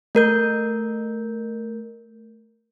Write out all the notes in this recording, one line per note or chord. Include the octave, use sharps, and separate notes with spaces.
A3 A#4 G6